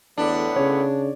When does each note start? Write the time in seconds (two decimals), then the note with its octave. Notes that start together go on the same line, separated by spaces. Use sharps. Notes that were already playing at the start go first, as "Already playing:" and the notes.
0.18 E2 A2 D3 B3 D4
0.56 C#3 C#5